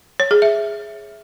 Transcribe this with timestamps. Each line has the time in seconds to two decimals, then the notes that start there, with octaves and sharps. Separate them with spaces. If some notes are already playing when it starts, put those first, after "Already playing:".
0.20 C#5
0.31 G#4
0.42 E5